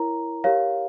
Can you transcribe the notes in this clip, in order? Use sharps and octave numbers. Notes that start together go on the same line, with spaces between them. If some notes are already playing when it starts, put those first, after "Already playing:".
Already playing: E4 A#4 C#5 A#5
G4 A#4 C#5 F5